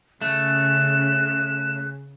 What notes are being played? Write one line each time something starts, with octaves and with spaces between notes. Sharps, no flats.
C#3 A3 F#6 E7